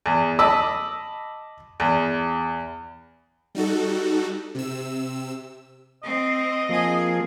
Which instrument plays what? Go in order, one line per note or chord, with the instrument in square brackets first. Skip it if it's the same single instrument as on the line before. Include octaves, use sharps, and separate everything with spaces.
[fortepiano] E2
D#5 A5 B5 D6 E6
E2
[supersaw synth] G3 D#4 F#4 A4
C3 E6
[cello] C4 [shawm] D#5
[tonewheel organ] F3 A#3 [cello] C4 G#4